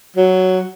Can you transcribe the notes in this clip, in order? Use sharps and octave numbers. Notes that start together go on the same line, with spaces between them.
F#3